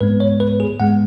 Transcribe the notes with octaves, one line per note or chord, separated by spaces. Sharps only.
G#2 G#3 B3 B4
C#5
B4
G#4
G#2 G#3 B3 F#5